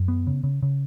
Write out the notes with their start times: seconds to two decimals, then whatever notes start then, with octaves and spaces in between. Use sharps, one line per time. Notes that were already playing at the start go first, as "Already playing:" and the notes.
Already playing: F#2
0.08 B3
0.27 C#3
0.44 C#3
0.63 C#3